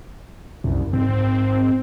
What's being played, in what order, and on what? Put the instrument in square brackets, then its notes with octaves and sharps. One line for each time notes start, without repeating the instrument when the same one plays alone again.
[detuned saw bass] C2 [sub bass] F#2
[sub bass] G#2 [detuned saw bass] C4